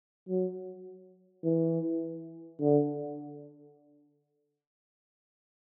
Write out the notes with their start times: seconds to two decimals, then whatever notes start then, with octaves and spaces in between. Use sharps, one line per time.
0.29 F#3
1.44 E3
2.61 D3